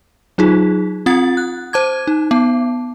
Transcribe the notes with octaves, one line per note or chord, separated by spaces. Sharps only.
F#3 D#4 F4 G#4
C4 F4 F#5 A6
F#6
C5 A5 D6 G#6
D#4
B3 A5